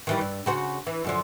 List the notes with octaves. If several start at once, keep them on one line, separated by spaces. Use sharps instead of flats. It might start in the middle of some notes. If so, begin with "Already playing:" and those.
D#3 E3 G3
G2
C#3 F#4 C5
E3
F#2 D3 F3